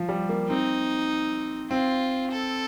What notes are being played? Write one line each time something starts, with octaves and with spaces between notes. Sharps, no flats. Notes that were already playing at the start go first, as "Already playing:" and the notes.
Already playing: F3
G3
A#3
C4 D#4
C4 F4
A4